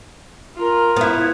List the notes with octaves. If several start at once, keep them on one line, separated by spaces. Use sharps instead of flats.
F4 A#4
B3 E4